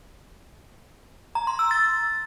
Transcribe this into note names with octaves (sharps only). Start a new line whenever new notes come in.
A#5
C6
E6
A6